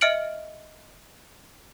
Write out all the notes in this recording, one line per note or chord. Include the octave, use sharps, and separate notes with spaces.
D#5 E5 F6 C#7 D7 F#7